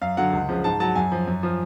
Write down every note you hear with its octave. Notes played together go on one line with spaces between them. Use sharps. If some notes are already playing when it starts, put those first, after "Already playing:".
F#2 F5
D3 F#3 F#5
C#2
C#3 F3
G#2 A5
F#3 A5
F#2 G#5
F3
F#2
F3